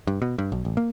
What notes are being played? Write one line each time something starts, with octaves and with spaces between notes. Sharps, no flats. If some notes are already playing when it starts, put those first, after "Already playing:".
G2
B2
G2
B1
A1
A#3